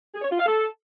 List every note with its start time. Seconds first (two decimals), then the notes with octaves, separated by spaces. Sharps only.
0.14 G#4
0.22 C#5
0.30 F4
0.38 F5
0.46 A4